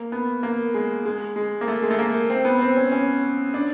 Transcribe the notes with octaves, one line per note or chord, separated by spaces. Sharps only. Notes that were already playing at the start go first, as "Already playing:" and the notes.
Already playing: A#3
B3
A#3
G#3
G#3
G#3
A#3
A3
G#3
A3
A#3
C4
B3
C4
C#4
C#4
D4